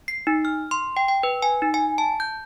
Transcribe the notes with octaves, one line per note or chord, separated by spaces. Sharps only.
C7
D#4
F6
C6
G5
G5
B4
G#5
D#4
G#5
A5
G6